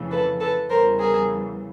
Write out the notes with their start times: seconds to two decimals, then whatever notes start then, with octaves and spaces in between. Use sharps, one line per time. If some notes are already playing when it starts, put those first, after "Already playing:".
Already playing: F2 C#3 E3 A3
0.11 A4 B4
0.40 A4 B4
0.69 E2 C#3 E3 G3 A#4 C5
0.99 G#4 A#4